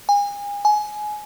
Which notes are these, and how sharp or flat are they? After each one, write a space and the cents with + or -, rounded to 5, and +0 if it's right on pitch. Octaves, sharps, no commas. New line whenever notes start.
G#5 -35
G#5 +20